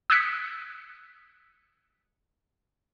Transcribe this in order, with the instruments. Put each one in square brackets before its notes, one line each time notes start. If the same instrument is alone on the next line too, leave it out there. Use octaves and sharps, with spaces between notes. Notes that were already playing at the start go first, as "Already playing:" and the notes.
[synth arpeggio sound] D#6 E6 F#6 G#6 B6 C#7